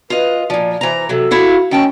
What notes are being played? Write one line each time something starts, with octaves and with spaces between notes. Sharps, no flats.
F4 B4 D#5
A#2 F3 D5
E3 C5 A#5
C3 F#3 A4
E4 F#4 F5
D#3 C#4 G5 A5